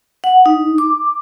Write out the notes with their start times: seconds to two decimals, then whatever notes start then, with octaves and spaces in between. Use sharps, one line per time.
0.24 F#5
0.46 D#4
0.78 D6